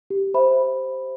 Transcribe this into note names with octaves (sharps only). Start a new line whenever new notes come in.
G4
C5 E5 B5